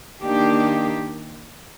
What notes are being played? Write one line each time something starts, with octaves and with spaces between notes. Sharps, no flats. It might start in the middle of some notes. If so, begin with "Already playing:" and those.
D#3 A#3 D4 G4